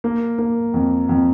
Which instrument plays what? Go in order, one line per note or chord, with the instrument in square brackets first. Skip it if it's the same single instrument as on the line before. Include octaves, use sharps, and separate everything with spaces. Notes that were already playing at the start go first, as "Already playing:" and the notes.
[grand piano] A#3
A#3
F2
F2